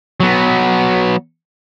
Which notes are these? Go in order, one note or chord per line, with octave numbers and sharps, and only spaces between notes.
F#3 B3